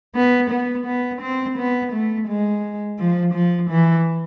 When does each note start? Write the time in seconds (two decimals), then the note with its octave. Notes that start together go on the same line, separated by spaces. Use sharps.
0.15 B3
0.51 B3
0.86 B3
1.22 C4
1.58 B3
1.93 A3
2.28 G#3
2.99 F3
3.34 F3
3.70 E3